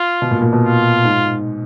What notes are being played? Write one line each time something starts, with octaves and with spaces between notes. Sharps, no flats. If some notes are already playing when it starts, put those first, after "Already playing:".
Already playing: F4
B2
A#2
A#2
B2
F4
G#2